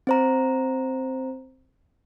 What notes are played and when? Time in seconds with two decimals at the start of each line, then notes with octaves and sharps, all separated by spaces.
0.07 C4 C5 A#5